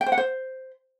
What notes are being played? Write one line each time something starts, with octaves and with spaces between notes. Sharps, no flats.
G5
C5
F#5
C5